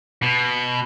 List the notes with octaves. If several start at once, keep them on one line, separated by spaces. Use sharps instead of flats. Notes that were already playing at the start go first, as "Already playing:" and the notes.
B2